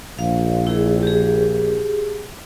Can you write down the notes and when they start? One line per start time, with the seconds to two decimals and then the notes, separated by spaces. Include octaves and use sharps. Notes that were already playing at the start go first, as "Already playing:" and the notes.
0.19 A#1 F5
0.67 E4 G#4
1.03 G4 G#4